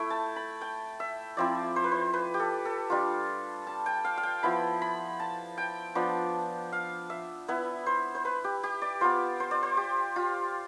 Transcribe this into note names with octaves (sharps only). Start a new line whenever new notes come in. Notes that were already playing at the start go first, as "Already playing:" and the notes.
Already playing: A3 E4 G5
A5
B5
G5
E5
F3 C4 E4 D5
C5
B4
C5
B4
G4
A4
A4
G3 D4 F4
A5
G5
F5
F5
G5
F3 B3 E4 B5
B5
A5
G5
F3 B3 D4
F5
E5
B3 E4 B4
C5
C5
B4
G4
G4
D5
B3 F4 C5
C5
D5
C5
G4
F4